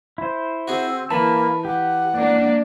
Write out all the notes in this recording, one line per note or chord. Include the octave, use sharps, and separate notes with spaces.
E4 C5
C4 F#4 G#4
E3 A#3 A5 B5
G4 F#5
A#3 D4 D5